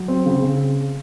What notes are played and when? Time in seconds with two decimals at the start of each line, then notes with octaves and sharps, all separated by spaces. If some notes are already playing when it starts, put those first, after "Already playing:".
Already playing: F#3
0.08 C4
0.26 C#3
0.42 C#3